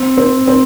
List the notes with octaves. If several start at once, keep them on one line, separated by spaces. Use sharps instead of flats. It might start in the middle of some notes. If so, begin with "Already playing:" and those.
Already playing: C4
C4
C4